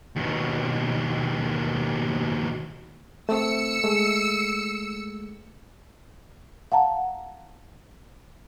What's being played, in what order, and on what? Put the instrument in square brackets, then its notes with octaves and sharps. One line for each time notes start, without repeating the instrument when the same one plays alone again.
[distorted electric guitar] D#2 B2
[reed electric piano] A3 C4 [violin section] E6 C#7
[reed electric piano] G#3 A3
[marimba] F5 F#5 A5 A#5